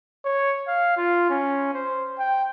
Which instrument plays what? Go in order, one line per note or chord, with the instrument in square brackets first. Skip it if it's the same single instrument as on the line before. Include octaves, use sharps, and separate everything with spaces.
[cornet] C#5
F5
F4
C#4
C5
G5